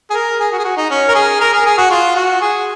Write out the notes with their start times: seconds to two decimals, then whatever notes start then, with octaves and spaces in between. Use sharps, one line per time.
0.10 G#4
0.14 A#4
0.39 G#4
0.52 F#4
0.59 G#4
0.64 F#4
0.77 D#4
0.90 C#4
1.08 A#4
1.15 G#4
1.41 A#4
1.53 G#4
1.66 G#4
1.78 F#4
1.91 F4
2.16 F#4
2.41 G#4